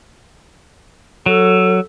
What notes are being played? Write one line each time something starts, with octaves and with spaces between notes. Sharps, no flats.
F#3 A4